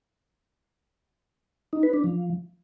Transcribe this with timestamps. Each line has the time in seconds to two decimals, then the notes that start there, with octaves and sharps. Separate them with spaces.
1.73 D#4
1.83 B4
1.93 D4
2.04 F3